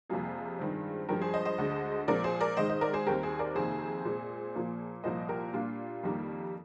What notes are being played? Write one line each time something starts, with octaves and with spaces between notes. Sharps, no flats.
F2 C3 G3 A#3 F4 G#4
G2 D#3 G#3 C4
G2 F3 G#3 G4 A#4
G#4 C5
C5 D#5
C5 D#5
D2 D3 G#3
A#2 F3 G#3 C4 A#4 D5
G#4 C5
A#4 D5
G#2 D#3 G#3 C5 D#5
C5 D#5
A#4 D5
G#4 C5
D#2 D#3 G3 C4 G4 A#4
G#4 C5
A#4 D5
F2 C3 D#3 A#3 G#4 C5
A#2 G#3 C4
A#2 F3 A#3
C2 A#2 F3 A#3 C5 D#5
G4 A#4
A#2 G3 A#3 D4 F4
F2 D#3 G3 A#3